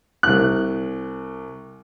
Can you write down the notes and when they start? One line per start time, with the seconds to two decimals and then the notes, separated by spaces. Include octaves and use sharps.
0.23 C2 F#6